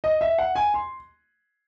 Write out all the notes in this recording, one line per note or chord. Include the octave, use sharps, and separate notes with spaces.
D#5
E5
F#5
G#5
C6